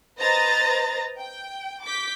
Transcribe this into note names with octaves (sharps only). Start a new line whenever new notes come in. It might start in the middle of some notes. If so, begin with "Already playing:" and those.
B4 C5 D#5 A#5 A6 A#6
G5
D6 G6 B6